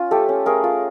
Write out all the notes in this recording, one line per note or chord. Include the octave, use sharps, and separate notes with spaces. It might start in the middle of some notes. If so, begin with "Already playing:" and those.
Already playing: C#4 F4
A3 G4 A4
C#4
A3 G#4 A#4
F4